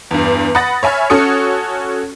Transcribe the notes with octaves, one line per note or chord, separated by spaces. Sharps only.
E2 G2
F#5 B5 D#6 A6 A#6
C#5 E5 G#5 B5 F6
C#4 F#4 A4 C#5 D#6 C#7